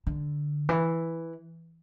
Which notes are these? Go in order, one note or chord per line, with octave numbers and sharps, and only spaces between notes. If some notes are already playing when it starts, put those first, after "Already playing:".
D3
E3